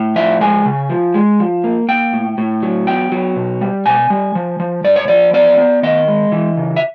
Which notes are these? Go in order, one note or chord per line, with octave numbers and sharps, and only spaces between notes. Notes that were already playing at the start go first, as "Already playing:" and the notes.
Already playing: A2
F3 E5
G#3 G#5
C#3
F3
G#3
F3
A#3
A#3 G5
A2
A2
F#3
B3 G5
F#3
B2
G3
B2 G#5
G3
F3
F3
G2 D5
C#5
F3 D5
B3 D5
B3
D#3 D#5
G#3
E3
C#3
E5